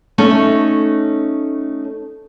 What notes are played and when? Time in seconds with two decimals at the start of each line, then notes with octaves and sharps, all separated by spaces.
0.18 A3 C#4 D#4